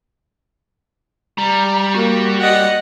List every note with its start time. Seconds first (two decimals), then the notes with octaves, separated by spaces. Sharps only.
1.38 G3 A#5
1.95 A#3 F#4
2.41 D#5 F#5